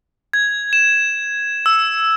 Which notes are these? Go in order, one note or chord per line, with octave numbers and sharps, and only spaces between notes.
G#6
E7
E6